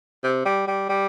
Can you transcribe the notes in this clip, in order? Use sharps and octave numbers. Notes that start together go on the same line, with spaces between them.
C3
G3
G3
G3